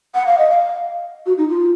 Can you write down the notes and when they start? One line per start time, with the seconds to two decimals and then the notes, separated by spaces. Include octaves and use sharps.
0.15 F#5
0.27 F5
0.38 D#5
0.50 F5
1.26 F#4
1.38 D#4
1.48 F4